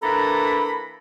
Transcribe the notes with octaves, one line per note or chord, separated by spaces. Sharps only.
E3 A#3 D4 A4 A#5 B5